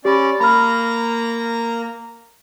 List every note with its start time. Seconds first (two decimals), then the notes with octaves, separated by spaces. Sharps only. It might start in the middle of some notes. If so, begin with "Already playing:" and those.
0.05 C#4 G4 D5 B5
0.40 A#3 A#5 B5 F6